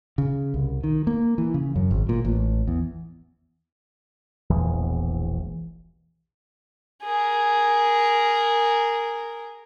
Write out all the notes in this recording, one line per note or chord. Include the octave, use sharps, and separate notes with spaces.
C#3
C2
D#3
A#3
E3
C#3
F#2
G#1
A#2
A1
E2
E1 A#1 E2 E3
G#4 A#4